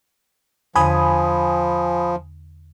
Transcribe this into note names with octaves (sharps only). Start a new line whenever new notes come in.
E2 D3 F3 G#5 B5 D#6